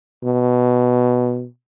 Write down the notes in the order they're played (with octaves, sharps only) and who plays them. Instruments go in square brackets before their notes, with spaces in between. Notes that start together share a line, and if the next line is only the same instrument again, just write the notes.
[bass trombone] B2